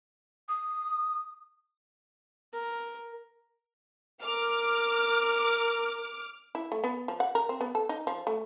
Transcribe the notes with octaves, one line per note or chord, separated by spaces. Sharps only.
D#6
A#4
A#4 D6 F6
E4
A3
B3
F3
F#5
A#4
C4
B3
A4
D#4
F3
A3